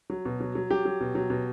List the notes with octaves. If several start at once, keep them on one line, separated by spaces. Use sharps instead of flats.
F#3
B2
F#3
F#3
F#3 G4
F#3
B2
F#3
B2